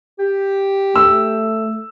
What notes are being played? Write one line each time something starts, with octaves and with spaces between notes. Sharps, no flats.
G4
A3 E6